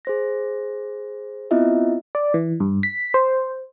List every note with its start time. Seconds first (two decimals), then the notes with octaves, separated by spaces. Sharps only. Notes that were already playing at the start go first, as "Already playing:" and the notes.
0.05 G#4 C5 A#6
1.51 B3 C4 E4 F4 D#5 E5
2.15 D5
2.34 E3
2.60 G2
2.83 B6
3.14 C5